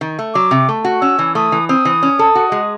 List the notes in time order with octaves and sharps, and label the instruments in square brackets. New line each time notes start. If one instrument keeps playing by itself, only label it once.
[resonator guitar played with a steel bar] D#3
A3
[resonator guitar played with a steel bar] F#3 [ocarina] D6
[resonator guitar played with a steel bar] C3
A3
F#4
[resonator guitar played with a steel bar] C#4 [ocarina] E6
[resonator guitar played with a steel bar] E3
[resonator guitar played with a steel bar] A3 [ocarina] D#6
[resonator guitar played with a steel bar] E3
[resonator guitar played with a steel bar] C4 [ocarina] D#6
[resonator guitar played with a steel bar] E3
C#4
A4
F#4
G#3